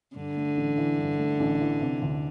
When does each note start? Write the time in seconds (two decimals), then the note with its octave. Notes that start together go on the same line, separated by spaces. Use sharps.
0.16 G2 D3
0.36 A3
0.57 A1
0.78 E3
0.99 G2
1.19 A3
1.40 A1
1.61 E3
1.81 C3
2.02 D2